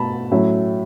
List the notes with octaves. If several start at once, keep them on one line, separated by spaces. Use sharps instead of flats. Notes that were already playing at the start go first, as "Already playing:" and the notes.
Already playing: B2 A3 A5 B5
A2 F#3 C#4 E4